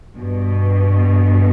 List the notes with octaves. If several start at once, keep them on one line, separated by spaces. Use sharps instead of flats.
G2 B2